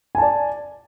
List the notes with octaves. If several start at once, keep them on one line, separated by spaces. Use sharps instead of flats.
D5 G#5 A5